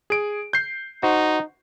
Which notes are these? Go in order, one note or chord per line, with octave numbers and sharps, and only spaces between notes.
G#4 D7
G6 C7
D#4 F#4 C5